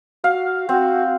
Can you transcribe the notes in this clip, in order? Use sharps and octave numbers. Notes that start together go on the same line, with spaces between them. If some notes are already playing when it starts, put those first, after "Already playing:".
F#4 F5
C4 F#4